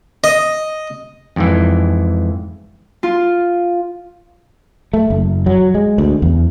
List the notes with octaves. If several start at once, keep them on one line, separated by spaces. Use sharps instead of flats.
D#5
F2 G#2 E3
F4
A3
F#1
F#3
G#3
D2
E2